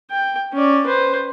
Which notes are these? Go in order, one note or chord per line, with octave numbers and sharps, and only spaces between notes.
G5
C#4 D5
B4 C5